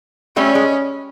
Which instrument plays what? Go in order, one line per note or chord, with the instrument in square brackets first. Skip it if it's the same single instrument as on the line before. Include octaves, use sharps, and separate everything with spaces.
[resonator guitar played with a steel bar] G3 A3 [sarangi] C#4
[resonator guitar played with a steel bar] G#3